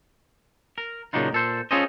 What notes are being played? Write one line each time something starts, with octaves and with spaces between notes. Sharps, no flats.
A#4
A#2 C#3 F#3 D4 D#4 F4
A#2 A4 C5
C#4 F4 G#4 A4 C5 D#5